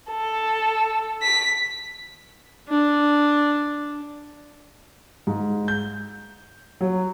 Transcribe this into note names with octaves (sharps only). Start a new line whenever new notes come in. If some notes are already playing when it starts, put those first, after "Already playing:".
A4
B6
D4
G#2
G6
F#3